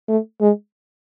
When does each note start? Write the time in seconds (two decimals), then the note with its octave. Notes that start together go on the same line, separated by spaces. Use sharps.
0.09 A3
0.41 G#3